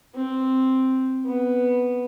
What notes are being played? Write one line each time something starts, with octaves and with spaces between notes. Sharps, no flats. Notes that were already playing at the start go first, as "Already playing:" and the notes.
C4
B3